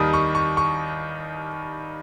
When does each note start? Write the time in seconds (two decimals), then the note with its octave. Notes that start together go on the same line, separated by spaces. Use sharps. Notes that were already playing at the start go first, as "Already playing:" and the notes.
Already playing: D#2 D#3 G3 D#6
0.13 C#6
0.35 C#6
0.57 C#6